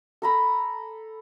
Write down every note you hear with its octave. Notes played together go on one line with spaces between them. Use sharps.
A4 A#5 B5